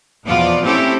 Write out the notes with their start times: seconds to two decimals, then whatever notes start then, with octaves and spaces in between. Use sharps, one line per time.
0.25 E2 B2 F3 B3 F4 D5
0.63 A3 C4 C#4 E4 G4 A4